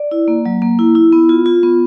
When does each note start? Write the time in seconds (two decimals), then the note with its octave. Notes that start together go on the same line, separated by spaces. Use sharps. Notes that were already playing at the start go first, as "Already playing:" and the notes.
Already playing: D5
0.11 E4
0.28 A#3
0.46 F#3
0.62 A#3
0.79 E4
0.95 E4
1.12 B3
1.29 F4
1.46 F4
1.63 B3